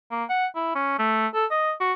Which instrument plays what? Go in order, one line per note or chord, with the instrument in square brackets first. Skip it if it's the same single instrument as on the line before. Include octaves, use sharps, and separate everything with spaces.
[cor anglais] A#3
F#5
E4
C#4
A3
A4
D#5
F#4